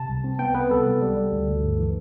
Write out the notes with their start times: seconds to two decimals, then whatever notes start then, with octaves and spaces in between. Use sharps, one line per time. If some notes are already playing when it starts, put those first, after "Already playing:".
Already playing: C3 A5
0.09 C2
0.24 C4
0.39 B3 G5
0.55 B3 B4
0.71 C2 A4
0.86 C2
1.02 G3
1.17 G3
1.32 D2
1.48 D2
1.63 G2
1.78 E3